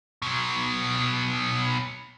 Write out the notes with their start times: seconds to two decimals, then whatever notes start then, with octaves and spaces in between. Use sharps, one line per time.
0.22 B2 F#3